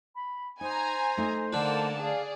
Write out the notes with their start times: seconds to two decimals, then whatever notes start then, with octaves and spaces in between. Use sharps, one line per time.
0.15 B5
0.61 D#4 C5 G#5 A#5
1.17 A3 D#4
1.53 D3 A#3 F#5 A5
2.01 G#4 D5 F5